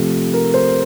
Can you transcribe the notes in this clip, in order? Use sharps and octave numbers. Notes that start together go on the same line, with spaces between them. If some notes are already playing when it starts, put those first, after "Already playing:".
Already playing: C3 F3 A3
A#4
C5